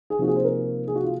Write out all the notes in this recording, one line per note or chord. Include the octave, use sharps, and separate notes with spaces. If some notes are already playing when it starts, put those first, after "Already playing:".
G#4
C3 F3 A#3 D#4 F#4
G#4
C5
A#4
G#4
F#4
F4